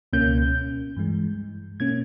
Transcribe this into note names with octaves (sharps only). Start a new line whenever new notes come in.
C#2 B2 A#3 C#4 G6
G2 E3 G#3
B2 A#3 C#4 G#6